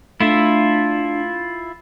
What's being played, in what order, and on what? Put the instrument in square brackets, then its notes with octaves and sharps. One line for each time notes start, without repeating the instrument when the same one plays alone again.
[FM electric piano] A3 [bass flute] D4 [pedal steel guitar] E4 F4 E5